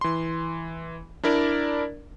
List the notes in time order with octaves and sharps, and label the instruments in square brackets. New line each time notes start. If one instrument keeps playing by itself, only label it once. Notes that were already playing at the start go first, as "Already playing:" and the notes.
[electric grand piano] E3 C6
D4 E4 A#4 D5